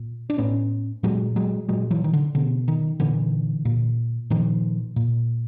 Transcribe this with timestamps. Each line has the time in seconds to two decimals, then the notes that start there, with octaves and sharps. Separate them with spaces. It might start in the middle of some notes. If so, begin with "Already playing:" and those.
Already playing: A#2
0.30 D4
0.38 A2 B3 C#4
1.03 A#2 F#3 G#3
1.36 F#3 G#3
1.69 A#2 F#3 G#3
1.91 E3 F#3
2.04 D#3
2.13 D3
2.35 B2 D3
2.68 D#3
3.00 A#2 D3 E3
3.65 A#2
4.30 A#2 D#3 F3
4.96 A#2